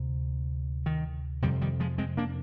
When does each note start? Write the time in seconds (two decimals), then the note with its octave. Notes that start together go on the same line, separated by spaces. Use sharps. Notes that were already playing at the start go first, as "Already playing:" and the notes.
Already playing: D2 C3
0.86 D#3
1.42 F2 C3 D#3 G3
1.61 D#3 G3
1.80 F3 G#3
1.98 G#3 C4
2.17 A#3 D4